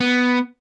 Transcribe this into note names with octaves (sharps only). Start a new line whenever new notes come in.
B3